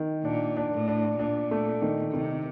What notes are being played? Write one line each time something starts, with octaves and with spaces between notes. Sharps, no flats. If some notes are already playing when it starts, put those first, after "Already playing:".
Already playing: D#3
A#2 D4
D4
A2
D4
A#2 D4
A3
D#3
C3 D#3